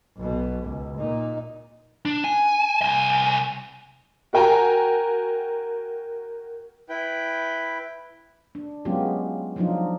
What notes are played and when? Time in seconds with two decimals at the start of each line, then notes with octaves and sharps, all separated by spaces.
0.17 B1 B2
0.64 C#2
0.98 A#2 D#4
2.05 D4
2.24 G#5
2.82 C2 G#5
4.33 F#4 A#4 G5 G#5 A#5
6.89 E4 B4 G5
8.55 D4
8.85 F#3 G#3 B3 C#4 F4 G4
9.56 F3 F#3 D4 D#4 F4